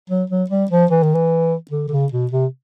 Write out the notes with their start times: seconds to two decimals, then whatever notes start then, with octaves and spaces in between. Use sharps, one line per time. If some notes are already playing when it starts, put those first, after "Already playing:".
0.10 F#3
0.30 F#3
0.50 G3
0.71 F3
0.91 E3
1.03 D#3
1.15 E3
1.71 D3
1.88 D3
1.91 C#3
2.12 B2
2.31 C3